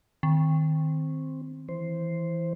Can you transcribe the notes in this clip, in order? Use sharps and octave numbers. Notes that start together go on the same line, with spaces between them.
D#3 C4
E3 C5